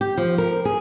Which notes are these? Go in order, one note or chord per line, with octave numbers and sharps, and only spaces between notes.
G4
F3
A#4
G#4